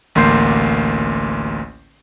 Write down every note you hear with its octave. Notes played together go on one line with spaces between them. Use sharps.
A1 D2 A#3 C6 G6 C7